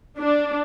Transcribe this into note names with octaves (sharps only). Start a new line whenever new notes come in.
D4